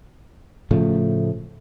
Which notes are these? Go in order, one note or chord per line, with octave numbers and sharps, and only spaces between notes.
A2 C#3 F3 A3